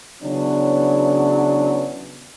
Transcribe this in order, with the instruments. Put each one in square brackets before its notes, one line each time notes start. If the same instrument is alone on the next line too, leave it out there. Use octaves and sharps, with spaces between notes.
[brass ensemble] C#3 E3 F#3 B3 C#4 D4